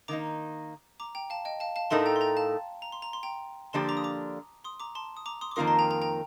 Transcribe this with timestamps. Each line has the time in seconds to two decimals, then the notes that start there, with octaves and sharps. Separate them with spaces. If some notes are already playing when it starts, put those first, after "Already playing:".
0.08 D#3 A#3 D#4 A#5 D6
1.00 A#5 D6
1.15 G5 A#5
1.30 F5 A5
1.45 D#5 G5
1.60 F5 A5
1.76 F5 A5
1.90 A2 A3 D#4 A#4 A5 C6
2.06 G5 A#5
2.16 C6
2.21 G5 A#5
2.37 F5 A5
2.82 A#5
2.92 C6
3.02 A#5
3.13 C6
3.23 G5 A#5
3.73 D3 F3 A#3 D4 G4 A5 C6
3.89 A#5 D6
3.97 D#6
4.04 A#5 D6
4.64 C6 D#6
4.80 A#5 D6
4.95 A5 C6
5.17 D#6
5.26 A#5 D6
5.41 C6 D#6
5.51 D6
5.56 F2 D#3 A#3 F4 A#4 C6 D#6
5.67 A5 C6
5.79 G5 A#5
5.90 G5 A#5
6.02 G5 A#5